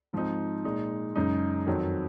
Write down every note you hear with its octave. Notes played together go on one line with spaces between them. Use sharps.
G#2 F3 C4 D#4
A#2 G#3 D#4
F#2 C#3 G#3 D#4
F2 D#3 F#3 C4